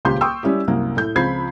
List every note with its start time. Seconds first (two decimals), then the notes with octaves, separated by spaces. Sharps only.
0.05 D#1 C#2 C#3 G4 C6 G6
0.21 G5 C6 C#6 D#6 E6
0.43 G3 C#4 E4 G4
0.67 C2 F#2 F#3 A#3
0.97 A2 G6
1.15 C#2 F3 C4 B5 G#6 C7